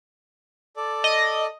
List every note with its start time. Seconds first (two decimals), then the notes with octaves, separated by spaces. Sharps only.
0.76 A4 D5
1.04 D#5